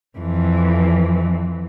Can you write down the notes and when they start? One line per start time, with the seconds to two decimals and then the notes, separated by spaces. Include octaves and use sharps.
0.19 F2 E3